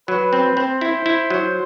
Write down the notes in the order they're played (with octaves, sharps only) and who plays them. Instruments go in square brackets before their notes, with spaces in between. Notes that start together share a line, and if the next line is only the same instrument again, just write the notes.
[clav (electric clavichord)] F#3 [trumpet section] B4
[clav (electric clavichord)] C4
[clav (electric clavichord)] C4 [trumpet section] C5
[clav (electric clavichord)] E4
E4
F#3